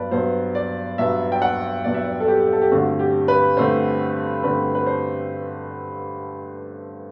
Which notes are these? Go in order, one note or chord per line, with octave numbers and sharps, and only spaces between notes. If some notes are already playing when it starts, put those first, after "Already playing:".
Already playing: G2 F#3 B3 B4 D5
G2 F#3 B3 C5
D5
G2 F#3 B3 E5
G5
F#5
G2 F#3 B3 D5
E5
D5
A4
G4
A4
G4
G2 D3 A3 C4 F#4
G4
B4
G2 D3 A3 C4 C5
G2 D3 A3 C4 B4
B4
C5